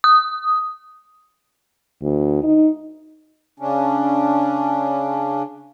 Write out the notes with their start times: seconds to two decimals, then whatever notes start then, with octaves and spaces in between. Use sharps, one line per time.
0.04 D#6
2.02 D2
2.43 D#4
3.60 C#3 C#4 D4